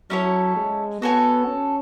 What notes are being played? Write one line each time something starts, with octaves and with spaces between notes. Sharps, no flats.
F#3 C#4 E4 A4 C#5
G#3
B3 F#4 A4 C#5 G#5
C#4